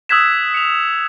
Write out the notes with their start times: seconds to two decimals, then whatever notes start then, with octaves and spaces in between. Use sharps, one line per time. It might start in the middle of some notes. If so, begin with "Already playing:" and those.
0.09 D#6 E6 F#6 G#6 B6 E7
0.54 C#7 F7